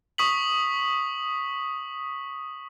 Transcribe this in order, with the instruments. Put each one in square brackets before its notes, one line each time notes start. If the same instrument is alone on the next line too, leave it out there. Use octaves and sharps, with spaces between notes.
[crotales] C#6 D#6 B6 F#7